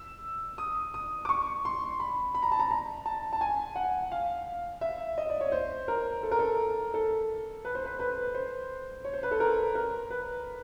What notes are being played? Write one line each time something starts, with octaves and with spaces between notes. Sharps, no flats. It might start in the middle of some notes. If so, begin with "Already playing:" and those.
Already playing: E6
D#6
D#6
D6
C#6
C6
B5
B5
A#5
A5
A#5
A#5
A5
A5
G#5
F#5
F5
E5
D#5
D5
C#5
C5
A#4
A4
A#4
A4
A4
B4
C5
B4
B4
C5
C#5
C5
B4
A4
A#4
A#4
B4